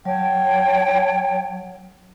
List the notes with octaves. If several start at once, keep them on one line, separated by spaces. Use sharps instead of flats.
F#3 C#5 G5 A5